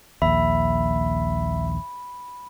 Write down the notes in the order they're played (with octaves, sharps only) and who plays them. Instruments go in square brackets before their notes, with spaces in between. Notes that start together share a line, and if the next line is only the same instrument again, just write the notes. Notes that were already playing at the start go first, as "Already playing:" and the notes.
[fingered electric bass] A#1 D#2 [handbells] E5 [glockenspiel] B5